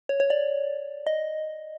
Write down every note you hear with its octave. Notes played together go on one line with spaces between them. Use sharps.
C#5
C#5
D5
D#5